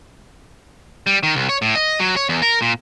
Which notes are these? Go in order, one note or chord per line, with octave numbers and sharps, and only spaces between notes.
G3
D#3
C2
C#5
A2
D#5
F#3
C#5
E2
A#4
A#2